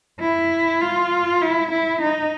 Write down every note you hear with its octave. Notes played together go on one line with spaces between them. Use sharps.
E4
F4
E4
E4
D#4